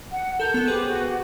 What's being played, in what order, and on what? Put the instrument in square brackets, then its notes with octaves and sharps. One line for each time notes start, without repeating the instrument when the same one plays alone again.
[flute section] F#5
[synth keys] A4 A#4 [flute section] G6
[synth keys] B3 A4
[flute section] G4 C5 [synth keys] G#4 B4
[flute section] F#4